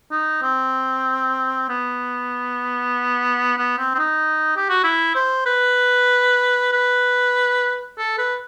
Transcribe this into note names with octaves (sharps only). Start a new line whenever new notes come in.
D#4
C4
B3
B3
C4
C4
D#4
G4
F#4
E4
C5
B4
B4
A4
B4